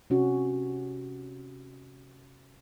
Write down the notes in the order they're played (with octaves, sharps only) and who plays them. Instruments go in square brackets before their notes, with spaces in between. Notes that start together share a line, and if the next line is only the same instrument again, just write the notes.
[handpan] C3 C#4 F#4